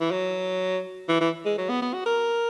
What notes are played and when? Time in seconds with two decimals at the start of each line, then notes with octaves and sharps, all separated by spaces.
0.01 E3
0.11 F#3
1.09 E3
1.21 E3
1.45 G#3
1.58 F#3
1.69 B3
1.82 B3
1.94 F#4
2.06 A#4